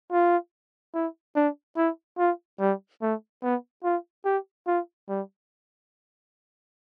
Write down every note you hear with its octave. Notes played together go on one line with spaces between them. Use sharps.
F4
E4
D4
E4
F4
G3
A3
B3
F4
G4
F4
G3